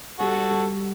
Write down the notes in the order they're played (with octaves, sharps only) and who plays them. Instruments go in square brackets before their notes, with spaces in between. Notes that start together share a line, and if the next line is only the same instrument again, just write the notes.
[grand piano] G3 [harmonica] F#4 A4
[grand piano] G3